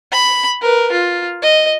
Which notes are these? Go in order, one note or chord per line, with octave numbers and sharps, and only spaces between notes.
B5
A#4 B4
F4
D#5